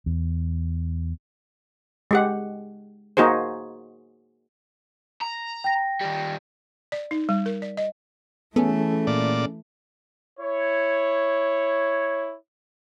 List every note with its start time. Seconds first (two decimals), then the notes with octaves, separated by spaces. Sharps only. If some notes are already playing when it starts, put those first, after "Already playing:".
0.06 E2
2.11 G#3 G4 F#5
3.17 A#3 D#4 F#4 G#4 C5
5.21 A#5
5.64 G5 A#6
6.01 D#3 G3
6.92 D5
7.11 D#4
7.29 G3
7.46 A#4
7.62 D5
7.77 D#5
8.56 E3 A3 B3 C#4 G#4 A4
9.07 A#2 D5
10.39 E4 C#5